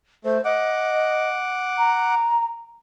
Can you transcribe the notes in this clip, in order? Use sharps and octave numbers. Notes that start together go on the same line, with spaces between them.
A3 C5
D#5 F#5 D6
A#5